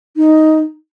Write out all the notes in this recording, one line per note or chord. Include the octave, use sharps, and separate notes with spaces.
D#4